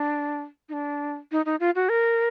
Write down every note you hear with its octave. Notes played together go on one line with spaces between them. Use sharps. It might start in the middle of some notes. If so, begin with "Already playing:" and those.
Already playing: D4
D#4
D4
D#4
D#4
F4
F#4
A#4